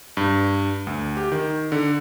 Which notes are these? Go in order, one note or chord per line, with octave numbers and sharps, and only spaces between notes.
G2
D2
G4
D#3
D3